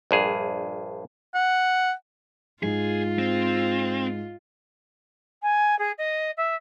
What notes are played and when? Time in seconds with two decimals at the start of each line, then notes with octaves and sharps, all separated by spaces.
0.11 A#1 G2 G#4
1.34 F#5
2.63 G#2 F4 G#4
3.19 C4
5.42 G#5
5.79 G#4
5.98 D#5
6.37 E5